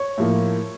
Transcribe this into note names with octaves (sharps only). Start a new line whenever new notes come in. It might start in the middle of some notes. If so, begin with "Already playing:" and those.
Already playing: C#5
A2 F3 A#3